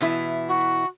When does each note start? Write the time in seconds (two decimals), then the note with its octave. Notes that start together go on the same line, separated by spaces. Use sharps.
0.01 B2 E3 E4
0.48 F#4